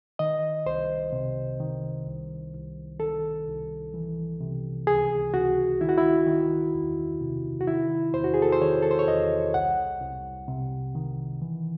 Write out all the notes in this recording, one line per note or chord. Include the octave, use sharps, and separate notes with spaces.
D#3 D#5
C2 C5
C3
D#3
C2
C2
D#3 A4
C2
E3
C3
C#2 G#4
C#2 F#4
D#3 E4
F#4
E4
D#3
E2
C3
F#4
D#3 E4
E2 C5
F#4
G#4
A4
C5
D#3 C#5
A4
C5
C#5
E2 D#5
C2 F#5
C2
C3
D#3
E3